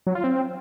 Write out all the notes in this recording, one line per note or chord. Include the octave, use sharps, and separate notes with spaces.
F#3
F4
C4